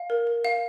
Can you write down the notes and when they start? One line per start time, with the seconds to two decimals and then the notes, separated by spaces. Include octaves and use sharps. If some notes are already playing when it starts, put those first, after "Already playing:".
Already playing: F5
0.10 A#4
0.27 A#4
0.45 F5